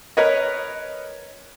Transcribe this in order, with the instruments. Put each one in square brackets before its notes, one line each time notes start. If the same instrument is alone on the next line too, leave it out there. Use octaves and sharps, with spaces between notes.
[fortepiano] A#4 B4 C#5 D#5